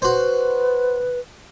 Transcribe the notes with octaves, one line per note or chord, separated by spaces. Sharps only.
F#4 B4 C5